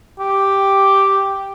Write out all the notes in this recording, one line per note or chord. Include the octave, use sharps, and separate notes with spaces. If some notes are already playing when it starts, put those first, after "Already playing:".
G4